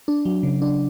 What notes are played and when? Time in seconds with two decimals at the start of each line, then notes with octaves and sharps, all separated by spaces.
0.08 D4
0.25 F#3
0.43 C#3
0.62 D4